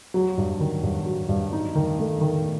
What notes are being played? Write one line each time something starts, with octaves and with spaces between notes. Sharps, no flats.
F#3
G2
D#3
G2
F#3
G2
D#4
D#3
A3
D#3